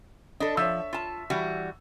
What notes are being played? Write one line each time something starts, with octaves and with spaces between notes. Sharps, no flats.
D4 A4 D#5
F3 C#5 E5 E6
F4 A5
E3 G3 F#4